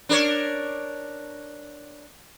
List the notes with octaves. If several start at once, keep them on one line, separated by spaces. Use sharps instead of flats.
D4 A#4 C#5